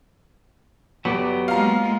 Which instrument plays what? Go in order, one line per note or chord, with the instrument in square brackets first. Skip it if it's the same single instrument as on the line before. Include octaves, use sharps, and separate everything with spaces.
[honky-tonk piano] G1 [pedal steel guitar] F#3 G4 D5 [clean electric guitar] B3
[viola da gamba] G#3 A#3 F4 [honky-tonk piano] F5 A#5